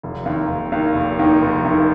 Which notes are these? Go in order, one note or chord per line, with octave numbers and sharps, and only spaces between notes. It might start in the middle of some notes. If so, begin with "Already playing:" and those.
F1
D#2 D#3
F1
D#2 D#3
F1
D#2 D#3
F1
D#2 D#3